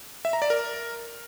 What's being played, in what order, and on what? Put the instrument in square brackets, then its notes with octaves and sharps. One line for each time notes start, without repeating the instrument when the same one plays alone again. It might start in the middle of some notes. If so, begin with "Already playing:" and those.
[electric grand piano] E5
A#5
D5
A#4